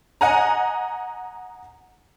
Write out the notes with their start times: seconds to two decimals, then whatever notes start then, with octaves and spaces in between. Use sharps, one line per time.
0.21 D#5 F#5 G#5 A#5